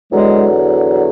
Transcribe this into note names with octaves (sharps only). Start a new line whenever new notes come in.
E2 D3 F#3 G#3